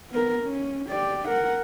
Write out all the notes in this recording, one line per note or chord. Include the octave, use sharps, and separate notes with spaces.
B3 A#4
C#4
G4 D5
A#4 F#5